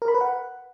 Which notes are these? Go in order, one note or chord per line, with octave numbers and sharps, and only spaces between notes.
A#4
B5
B4
F#5